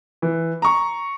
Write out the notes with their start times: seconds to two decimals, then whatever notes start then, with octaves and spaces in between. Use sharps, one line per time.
0.22 E3
0.62 A#5 C#6